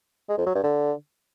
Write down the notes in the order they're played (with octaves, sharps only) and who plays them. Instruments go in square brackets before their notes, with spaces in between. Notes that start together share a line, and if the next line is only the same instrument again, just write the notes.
[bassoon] G#3
F2
F#3
G2
D3